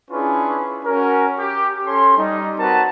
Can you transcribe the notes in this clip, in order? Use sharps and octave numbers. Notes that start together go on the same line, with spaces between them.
C#4 D4 E4 F4 G#4 B4
C#4 F#4 A#4
G4
C#4 A4 C#5 C6
G3 D#4
C4 F#4 A#4 B4 A5 A#5